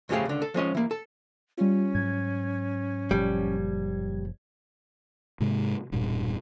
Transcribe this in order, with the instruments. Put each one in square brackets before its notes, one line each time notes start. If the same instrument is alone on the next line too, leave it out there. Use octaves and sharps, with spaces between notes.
[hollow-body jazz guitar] F2 C#3 A3 G4 G#4 F5
C#2 D3
A4
F3 G#3 C#4 D#5
E3 A#3
A4
[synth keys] G3 F4 [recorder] C#4
[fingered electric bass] G#2 F#3 [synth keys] G#6
[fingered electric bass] F#1 A#2 F3 [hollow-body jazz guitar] G3
[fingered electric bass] G#2 C3 G#3
E1 G2 A#2